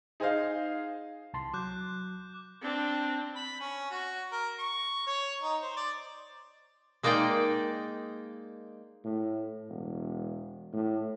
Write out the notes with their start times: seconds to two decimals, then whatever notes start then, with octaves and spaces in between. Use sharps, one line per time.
0.20 D#4 G#4 C5 D#5 F5
1.34 C2 A5 C6
1.54 F#3 D6 F#6 G6
2.62 C4 D4
3.36 B5
3.61 C#4
3.91 F#4
4.32 A#4
4.59 C#6
5.08 C#5
5.42 D#4
5.62 C5
5.77 D5
7.03 G#3 A#3 D#4 D5 G5
9.05 A2
9.69 E1
10.73 A2